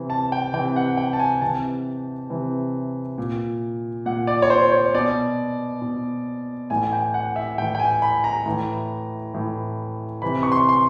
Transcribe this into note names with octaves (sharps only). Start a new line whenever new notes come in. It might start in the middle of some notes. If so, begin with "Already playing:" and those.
Already playing: C3 E3
A5
G5
C3 E3 G5
F#5
G5
A5
G#5
C3 E3 A5
C3 E3
A#2
A#2 F#5
D5
C#5
C5
C#5
B2 D5
B2
A2 E3 G#5
G5
F#5
E5
A2 E3 G5
G5
G#5
B5
A#5
A2 E3
A2 E3
C3 E3 B5
C#6
C6
C6